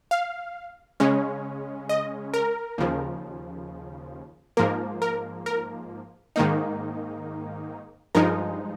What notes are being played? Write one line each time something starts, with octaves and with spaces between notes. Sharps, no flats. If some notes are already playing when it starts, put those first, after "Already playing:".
F5
C#3 G#3 C#4
D#5
A#4
D#2 C#3 F3
G#2 F3 A#3 A#4
A#4
A#4
G#2 D#3 A#3 D#4
G2 F3 G#3 D#4 A#4